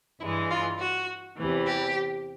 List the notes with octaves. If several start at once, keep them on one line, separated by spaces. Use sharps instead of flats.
G2 E3 G#3 E4
F4
F#4
E2 C3 E3
G4